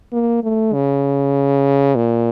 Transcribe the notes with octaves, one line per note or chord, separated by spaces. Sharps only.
A#3
A3
C#3
A#2